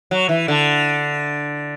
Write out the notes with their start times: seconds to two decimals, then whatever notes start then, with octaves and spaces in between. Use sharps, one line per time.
0.11 F#3
0.29 E3
0.48 D3